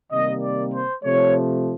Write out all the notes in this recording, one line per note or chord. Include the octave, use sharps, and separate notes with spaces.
C3 D#3 G3 A#3 D#5
D5
C5
C3 F3 A3 C#5